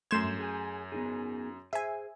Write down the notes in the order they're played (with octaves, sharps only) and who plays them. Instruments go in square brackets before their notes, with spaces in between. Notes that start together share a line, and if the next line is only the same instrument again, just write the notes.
[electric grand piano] F#2 G6 G#6 [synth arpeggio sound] A3 C6 E7
[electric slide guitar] G2
G#4 G5 G#5
B3 D#4 G#4
[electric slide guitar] G#4 C5 [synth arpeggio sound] E5 G#5